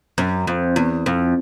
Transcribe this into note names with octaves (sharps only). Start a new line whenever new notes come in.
F#2
F2
E2
F2